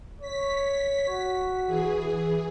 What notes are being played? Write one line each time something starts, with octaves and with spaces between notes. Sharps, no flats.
C#5 B6
F#4
E3 G#4